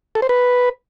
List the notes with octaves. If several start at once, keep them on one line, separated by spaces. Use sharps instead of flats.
A4
C5
B4